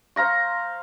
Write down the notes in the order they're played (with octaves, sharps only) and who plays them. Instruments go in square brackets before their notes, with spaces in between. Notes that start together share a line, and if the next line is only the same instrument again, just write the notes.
[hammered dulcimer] C5 F5 A#5 C#6